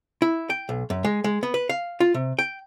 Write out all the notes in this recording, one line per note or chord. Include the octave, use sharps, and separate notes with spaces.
E4
G5
B1
F#2
G#3
G#3
B3
B4
F5
F4
C3
G5